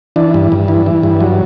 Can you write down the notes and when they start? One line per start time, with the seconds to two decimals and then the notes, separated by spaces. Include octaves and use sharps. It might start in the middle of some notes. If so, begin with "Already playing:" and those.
0.16 E3 D4
0.34 G2
0.52 G2
0.68 E3
0.86 E3
1.03 G2
1.21 F#3